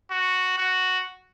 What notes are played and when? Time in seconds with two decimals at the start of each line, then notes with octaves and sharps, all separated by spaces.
0.11 F#4
0.58 F#4